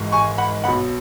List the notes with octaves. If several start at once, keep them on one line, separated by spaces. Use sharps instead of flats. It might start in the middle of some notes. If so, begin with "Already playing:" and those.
Already playing: G#1 G#2 E3 G#3
G#5 C#6
F#5 B5
B1 B2 F#3 B3 F#5 B5